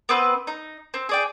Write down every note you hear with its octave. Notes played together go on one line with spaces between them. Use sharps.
B3 C4 B4
D#4
C4
G#4 D5 G5